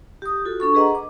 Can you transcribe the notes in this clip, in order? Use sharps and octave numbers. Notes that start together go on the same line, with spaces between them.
G4 D#6
F4 F#4 A4
D4 A4 C#6
G#4 B4 D#5 F#5 A#5
D6